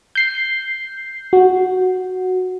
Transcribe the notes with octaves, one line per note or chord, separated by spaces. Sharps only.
G6 C7
F#4